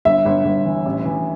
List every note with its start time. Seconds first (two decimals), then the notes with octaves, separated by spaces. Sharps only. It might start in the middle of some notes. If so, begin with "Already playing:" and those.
0.05 G1 E5
0.26 G1
0.45 G1
0.65 E3
0.85 A1
1.05 E3